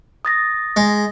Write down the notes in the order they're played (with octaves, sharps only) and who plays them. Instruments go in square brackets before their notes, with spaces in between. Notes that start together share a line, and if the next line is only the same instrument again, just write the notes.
[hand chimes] D#6 A6 A#6
[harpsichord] G#3